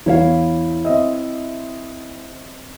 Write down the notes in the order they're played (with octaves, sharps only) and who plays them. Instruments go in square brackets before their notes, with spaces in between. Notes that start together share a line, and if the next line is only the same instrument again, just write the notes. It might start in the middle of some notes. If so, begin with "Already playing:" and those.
[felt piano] E2 [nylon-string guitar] E4 C#5 F5
[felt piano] C4 D#5 E5